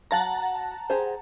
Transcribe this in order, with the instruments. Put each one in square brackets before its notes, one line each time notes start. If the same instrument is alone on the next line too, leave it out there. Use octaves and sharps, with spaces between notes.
[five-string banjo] F#3 F5 [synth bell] F#5 A5 A#5
[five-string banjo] G4 G#4 C5